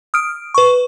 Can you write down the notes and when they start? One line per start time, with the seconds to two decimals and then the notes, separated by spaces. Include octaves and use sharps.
0.14 D#6 F6 D7
0.54 B4 C#6